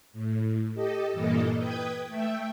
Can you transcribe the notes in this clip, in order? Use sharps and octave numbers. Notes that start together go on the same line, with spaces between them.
A2
G4 A4 D#5
G2 A#2 E3 A#3 A4 D#5
B4 G5 D#6 G6 G#6
A3 E5 G5